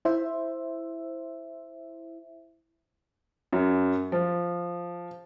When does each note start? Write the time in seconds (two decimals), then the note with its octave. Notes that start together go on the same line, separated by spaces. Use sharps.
0.05 E4 C5 E5
3.53 F#2
4.12 F3